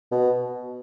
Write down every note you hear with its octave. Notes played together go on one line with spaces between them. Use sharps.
B2